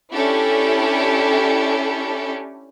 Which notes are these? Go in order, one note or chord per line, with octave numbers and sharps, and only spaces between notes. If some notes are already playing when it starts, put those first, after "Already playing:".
C#4 D4 E4 G4 A4